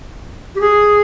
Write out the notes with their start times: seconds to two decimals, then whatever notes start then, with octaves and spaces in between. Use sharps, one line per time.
0.55 G4
0.60 G#4